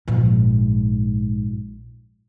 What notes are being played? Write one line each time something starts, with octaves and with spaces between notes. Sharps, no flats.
A#1 G#2